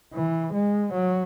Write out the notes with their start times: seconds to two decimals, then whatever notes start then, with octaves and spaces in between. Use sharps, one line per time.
0.14 E3
0.54 G#3
0.94 F#3